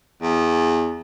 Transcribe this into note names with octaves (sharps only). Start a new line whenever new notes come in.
E2